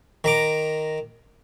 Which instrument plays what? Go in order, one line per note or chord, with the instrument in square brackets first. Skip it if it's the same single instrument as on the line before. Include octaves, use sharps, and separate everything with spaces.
[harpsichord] D#3 A#5 D6